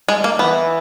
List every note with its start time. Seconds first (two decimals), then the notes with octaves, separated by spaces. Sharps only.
0.08 G#3
0.24 A#3
0.39 E3 B3